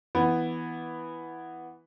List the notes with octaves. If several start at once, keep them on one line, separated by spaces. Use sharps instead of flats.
E3 B3